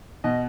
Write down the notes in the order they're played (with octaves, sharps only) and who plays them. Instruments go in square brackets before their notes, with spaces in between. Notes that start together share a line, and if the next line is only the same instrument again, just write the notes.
[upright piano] B2 D#5